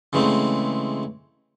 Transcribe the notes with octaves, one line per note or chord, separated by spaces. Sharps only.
C#3 E3 G#3 A3 C4